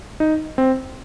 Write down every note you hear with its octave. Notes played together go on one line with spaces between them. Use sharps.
D#4
C4